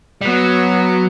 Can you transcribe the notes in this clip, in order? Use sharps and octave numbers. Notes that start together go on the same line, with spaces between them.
G3
F#3 B3